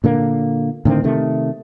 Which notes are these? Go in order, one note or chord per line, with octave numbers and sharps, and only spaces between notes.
A#2 D3 A#3
A2 D3 D#3 C4
C3 D#3 A3